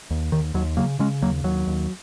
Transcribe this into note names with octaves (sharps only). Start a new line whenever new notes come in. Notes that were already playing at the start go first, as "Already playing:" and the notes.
D#2
D#2 D#3
D#2 F#3
C#3 F#3 A#3
C#3 G#3 C#4
D#2 F#3 A#3
D#2 F#3
D#2